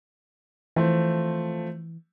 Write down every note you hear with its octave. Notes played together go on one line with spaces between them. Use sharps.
E3 F3 A3 C4